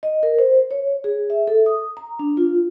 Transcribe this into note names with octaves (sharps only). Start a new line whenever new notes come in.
D#5
A#4
C5
C#5
G#4
E5
A4
D#6
A#5
D4
F4